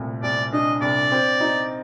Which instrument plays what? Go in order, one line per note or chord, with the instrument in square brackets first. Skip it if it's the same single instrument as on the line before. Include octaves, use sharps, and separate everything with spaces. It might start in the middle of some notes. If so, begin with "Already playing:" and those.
Already playing: [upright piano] C2 A#2 A3
[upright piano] C2 [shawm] D5
[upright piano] D4 [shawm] D#5
[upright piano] C2 [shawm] D5
[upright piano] C4
D#4